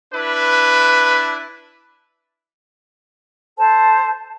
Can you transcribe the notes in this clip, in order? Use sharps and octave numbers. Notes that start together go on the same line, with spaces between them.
D4 E4 B4
A4 C5 A5